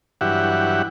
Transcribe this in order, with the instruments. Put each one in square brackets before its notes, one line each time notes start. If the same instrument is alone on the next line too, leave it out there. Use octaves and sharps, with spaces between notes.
[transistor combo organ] G2 E3 F#3 G4 E5 F#5